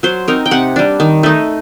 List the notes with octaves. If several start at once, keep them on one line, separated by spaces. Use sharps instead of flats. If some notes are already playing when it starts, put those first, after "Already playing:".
F#3 C5
C4 D#4 A#4
G5
C3 F#5
G3 D4
D#3
A3 D#4